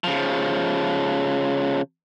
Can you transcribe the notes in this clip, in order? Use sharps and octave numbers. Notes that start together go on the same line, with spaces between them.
C#3 F3